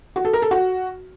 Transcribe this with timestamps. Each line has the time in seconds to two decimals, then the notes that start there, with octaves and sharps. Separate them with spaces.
0.16 F#4
0.25 A4
0.33 A#4
0.42 A4
0.51 F#4